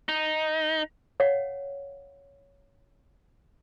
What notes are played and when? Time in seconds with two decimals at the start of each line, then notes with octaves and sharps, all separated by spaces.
0.09 D#4
1.20 C#5 F5 F#5